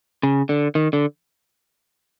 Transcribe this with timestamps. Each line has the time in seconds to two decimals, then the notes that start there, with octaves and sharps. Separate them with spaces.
0.23 C#3
0.49 D3
0.75 D#3
0.93 D3